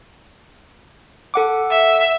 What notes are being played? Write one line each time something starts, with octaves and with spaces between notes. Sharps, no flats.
A4 F#5 D6
E5